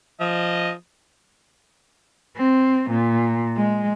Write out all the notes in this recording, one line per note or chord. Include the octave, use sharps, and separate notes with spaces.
F3 D#5
C4
A#2
G#3